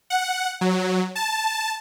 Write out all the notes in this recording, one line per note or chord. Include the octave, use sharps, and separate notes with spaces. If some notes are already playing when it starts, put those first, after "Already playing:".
F#5
F#3
A5